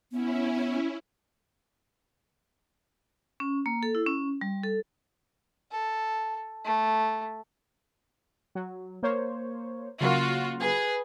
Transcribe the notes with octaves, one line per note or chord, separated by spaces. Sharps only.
B3 C#4 E4
C#4
A#3
A4
E4
C#4
G3
A4
A4
A3
F#3
A#3 C5 C#5
C#3 F#3 A#3 F4 F#4
G#4 B4